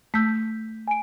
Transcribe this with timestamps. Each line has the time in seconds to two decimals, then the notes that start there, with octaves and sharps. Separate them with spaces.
0.14 A3 E6 G6 B6
0.88 G#5 D7